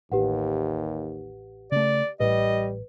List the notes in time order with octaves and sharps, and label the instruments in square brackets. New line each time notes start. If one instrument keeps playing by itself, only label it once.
[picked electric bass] A1 [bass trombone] D#2 [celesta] G4 B4 F#5
[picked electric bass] C#3 A3 [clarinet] D5
[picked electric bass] A1 A2 [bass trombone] G3 [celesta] B4 [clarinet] D#5